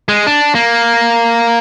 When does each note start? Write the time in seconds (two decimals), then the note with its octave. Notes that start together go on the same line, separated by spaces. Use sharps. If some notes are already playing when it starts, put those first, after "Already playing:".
0.08 G#3
0.27 D4
0.55 A#3